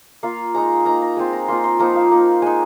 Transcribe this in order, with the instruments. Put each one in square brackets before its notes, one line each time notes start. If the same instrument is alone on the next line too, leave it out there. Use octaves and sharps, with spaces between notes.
[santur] A#3 F4 F5
G#3 D#4 A#5
A#3 D#4 A#5
A#5
G#3 C4 F4 G#5
A#5
A#3 F4 C6
C6
F3 A#3 D#4 A#5
F5
A#3 D#4
G#3 D#4 G#5